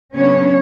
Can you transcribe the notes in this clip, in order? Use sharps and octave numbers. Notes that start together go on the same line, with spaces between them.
C#3 F#3 B3 C#4 D4 C#5